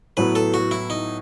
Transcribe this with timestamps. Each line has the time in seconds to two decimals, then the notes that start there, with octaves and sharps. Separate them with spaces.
0.17 A2 F#3 B3 B4
0.35 A4
0.54 F#4
0.71 E4
0.90 D#4